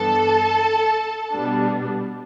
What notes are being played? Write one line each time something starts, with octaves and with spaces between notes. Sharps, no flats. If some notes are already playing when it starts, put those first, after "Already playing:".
Already playing: G2 E3 B3 D4 A4 A5
B2 G3 B3 D4